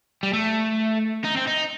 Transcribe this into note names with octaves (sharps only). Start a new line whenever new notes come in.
G3
A3
D#4
C4
D#4